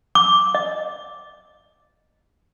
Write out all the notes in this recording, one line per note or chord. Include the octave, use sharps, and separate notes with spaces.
D6
D#5